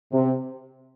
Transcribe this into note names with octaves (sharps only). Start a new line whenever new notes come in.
C3